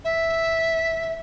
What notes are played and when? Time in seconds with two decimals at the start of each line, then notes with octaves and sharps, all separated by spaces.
0.05 E5